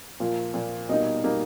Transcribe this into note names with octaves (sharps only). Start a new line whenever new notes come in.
A#2 F3 A#3
A#2 F3 A#3
B2 G3 A#3 D#4 D#5
B2 G3 A#3 D#4